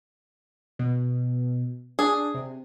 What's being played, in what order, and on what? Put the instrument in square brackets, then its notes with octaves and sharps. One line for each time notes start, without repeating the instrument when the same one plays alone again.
[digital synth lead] B2
[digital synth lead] D4 [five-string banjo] G#4
[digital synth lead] C3